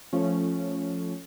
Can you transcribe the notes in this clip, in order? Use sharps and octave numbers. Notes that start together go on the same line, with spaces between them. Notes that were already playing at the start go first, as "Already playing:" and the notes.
F3 A3 C#4